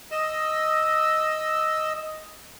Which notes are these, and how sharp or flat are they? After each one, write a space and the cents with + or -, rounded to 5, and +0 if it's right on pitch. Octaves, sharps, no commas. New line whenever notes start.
D#5 +5 E6 -5